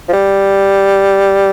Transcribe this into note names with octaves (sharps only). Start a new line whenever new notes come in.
F3
G3